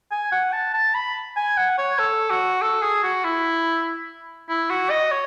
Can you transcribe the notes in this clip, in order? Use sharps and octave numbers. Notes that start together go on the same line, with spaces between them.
G#5
F#5
A5
A5
B5
G#5
F#5
C#5
A4
F#4
A4
G#4
F#4
E4
E4
F#4
D#5
C#5